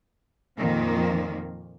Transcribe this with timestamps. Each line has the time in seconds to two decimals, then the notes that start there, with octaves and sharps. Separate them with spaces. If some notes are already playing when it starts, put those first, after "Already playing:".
0.57 F2 A#2 D#3 F3 A#3